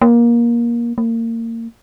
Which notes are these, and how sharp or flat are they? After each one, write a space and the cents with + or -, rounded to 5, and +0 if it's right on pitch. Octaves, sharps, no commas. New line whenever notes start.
A#3 +20
A#3 -30